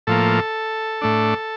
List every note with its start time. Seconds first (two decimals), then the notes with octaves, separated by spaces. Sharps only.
0.07 A2 F3 A#3 A4
1.01 A2 A3 D4